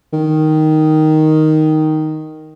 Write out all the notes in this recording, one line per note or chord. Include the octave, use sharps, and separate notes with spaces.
D#3